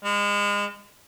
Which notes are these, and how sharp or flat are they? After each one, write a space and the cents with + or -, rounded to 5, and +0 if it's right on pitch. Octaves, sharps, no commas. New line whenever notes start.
G#3 -30